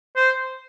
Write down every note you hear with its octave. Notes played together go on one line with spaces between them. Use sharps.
C5